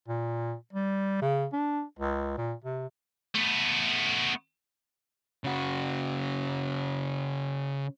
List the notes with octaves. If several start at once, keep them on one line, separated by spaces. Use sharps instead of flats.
A#2
G3
C#3
D4
C#2
A#2
C3
A3 B3
C#3 F#4